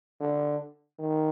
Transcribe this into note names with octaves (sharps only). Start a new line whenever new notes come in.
D3
D#3